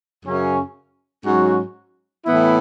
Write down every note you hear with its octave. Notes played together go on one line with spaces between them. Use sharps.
F#2 C#3 F#3 C#4
G#2 F#3 C#4 F#4
A2 E3 B3 E4